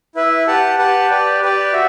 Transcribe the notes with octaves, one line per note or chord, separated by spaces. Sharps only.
E4 B4 E5
G4 B4 F#5 A5
G4 B4 F#5 A5
G4 B4 D5 G5
G4 B4 D5 G5
F#4 E5